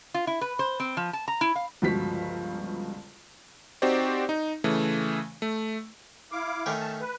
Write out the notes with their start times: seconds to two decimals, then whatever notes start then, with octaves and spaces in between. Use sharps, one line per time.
0.14 F4
0.27 E4
0.41 B4
0.59 C5
0.80 C4
0.97 F3
1.13 A5
1.28 A#5
1.41 E4
1.55 F5
1.82 G1 C#2 F3 F#4 B6
3.82 C4 D#4 F#4 G4 C5 D5
4.29 D#4
4.64 C#3 E3 A3
5.42 A3
6.32 E4 F5 D6
6.66 D#3 A3 C#4
6.80 A5
7.01 B4